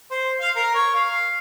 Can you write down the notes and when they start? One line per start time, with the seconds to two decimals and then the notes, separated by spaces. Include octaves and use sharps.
0.11 C5
0.40 F5
0.56 A#4
0.75 C#5
0.94 F5